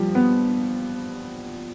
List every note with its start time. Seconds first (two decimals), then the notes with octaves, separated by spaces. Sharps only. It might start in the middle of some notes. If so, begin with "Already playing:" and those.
Already playing: F3 G3
0.15 B3